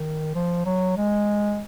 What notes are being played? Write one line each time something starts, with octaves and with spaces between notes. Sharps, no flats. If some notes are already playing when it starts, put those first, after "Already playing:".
Already playing: D#3
F3
F#3
G#3